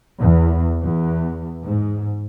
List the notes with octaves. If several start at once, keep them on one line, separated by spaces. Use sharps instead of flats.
E2
E2
G#2